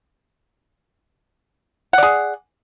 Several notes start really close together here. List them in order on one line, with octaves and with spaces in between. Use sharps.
F#5 D5 G#4